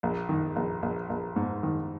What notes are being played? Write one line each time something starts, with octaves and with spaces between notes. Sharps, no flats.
A#1
D#3
A#1
A#1
A#1
G#2
D#3